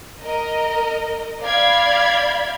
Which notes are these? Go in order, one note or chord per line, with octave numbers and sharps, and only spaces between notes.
A#4 D#5
D5 F5 B5 G#6